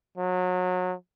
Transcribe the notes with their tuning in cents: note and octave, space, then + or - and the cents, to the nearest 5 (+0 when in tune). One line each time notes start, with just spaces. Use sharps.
F#3 -25